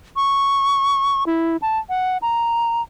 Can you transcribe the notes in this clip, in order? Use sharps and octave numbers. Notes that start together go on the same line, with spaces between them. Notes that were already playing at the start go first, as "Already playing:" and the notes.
C#6
E4
A5
F#5
A#5